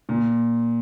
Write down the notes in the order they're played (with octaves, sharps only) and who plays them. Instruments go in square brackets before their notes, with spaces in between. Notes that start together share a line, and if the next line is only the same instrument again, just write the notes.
[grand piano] A#2